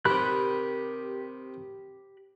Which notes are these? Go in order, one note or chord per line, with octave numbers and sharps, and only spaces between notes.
C3 D#3 G4 B5 F#6